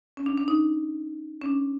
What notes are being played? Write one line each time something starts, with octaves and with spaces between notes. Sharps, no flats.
C#4
D4
D4
D#4
C#4
D4